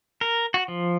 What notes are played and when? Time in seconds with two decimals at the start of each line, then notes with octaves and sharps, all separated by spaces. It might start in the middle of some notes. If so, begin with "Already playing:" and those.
0.21 A#4
0.54 F#4
0.68 F3